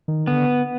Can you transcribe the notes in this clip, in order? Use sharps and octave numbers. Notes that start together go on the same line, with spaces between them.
D#3
D3 B3